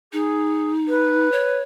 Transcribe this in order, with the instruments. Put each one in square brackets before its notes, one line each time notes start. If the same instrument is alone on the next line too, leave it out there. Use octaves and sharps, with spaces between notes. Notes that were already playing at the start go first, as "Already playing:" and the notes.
[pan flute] D#4 [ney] G#4
[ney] B4
[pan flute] C#5